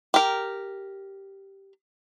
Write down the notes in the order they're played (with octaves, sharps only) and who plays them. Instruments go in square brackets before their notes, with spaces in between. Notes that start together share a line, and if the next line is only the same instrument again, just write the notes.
[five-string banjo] G4 A#4